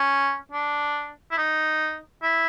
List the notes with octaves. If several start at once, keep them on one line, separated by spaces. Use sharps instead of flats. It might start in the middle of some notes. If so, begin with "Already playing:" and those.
Already playing: C#4
D4
E4
D#4
E4